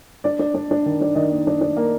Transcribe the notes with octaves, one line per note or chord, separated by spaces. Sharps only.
D4 D5
D4
D4
D4
D#3
D4
D#3 D#5
A#3
D4
D4
A#3